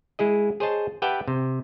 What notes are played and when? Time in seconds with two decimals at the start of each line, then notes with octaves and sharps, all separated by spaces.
0.19 G#3 E4 G#4 D#5
0.60 G#4 C5 C#5 D#5 A5
1.02 G4 B4 E5 F#5 G5 A5
1.28 C3